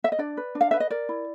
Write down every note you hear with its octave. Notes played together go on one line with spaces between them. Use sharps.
E5
D#5
D4 D5
B4
D4
F5
B4 E5
D#5
A#4 D5
E4